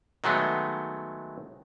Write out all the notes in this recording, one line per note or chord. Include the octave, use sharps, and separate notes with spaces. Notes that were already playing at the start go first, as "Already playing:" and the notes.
D#3 F#3 G#3 A3 B3